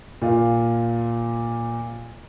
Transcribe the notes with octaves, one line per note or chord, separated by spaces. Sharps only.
A#2 F4